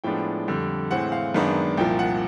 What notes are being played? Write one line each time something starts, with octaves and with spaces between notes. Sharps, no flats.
A2 F3 G#3 B3 D4 G5
F2 D3 G3
A2 E3 G#3 C4 F#5
F5
F#2 D#3 G#3 B3 D4
C2 A#2 F3 G5
F#5